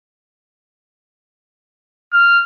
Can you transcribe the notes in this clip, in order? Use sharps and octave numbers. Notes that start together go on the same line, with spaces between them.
F6